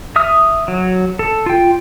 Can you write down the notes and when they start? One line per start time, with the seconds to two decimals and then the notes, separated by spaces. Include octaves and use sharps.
0.16 E5 D#6 F6
0.68 F#3
1.19 A4
1.46 F4 G5